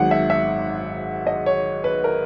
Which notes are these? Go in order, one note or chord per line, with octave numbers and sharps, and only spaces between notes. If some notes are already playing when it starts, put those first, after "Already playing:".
Already playing: G#1 G#2 F#3 F#5
E5
E5
D#5
C#5
B4
A#4